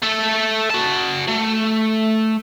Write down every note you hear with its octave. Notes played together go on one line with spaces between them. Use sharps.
A3 A4
F#4 A5
A3